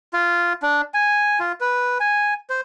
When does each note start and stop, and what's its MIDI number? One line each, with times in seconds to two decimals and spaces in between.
0.13 0.53 65
0.62 0.82 62
0.94 1.39 80
1.39 1.52 65
1.60 1.98 71
2.00 2.34 80
2.50 2.61 72